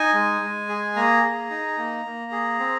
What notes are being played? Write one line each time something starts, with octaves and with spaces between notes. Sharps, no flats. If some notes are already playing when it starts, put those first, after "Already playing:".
Already playing: D#4 G#5
G#3
G#3
G#4
A#3 A#5
G#4
D#4
A#3
A#3
G#4
C4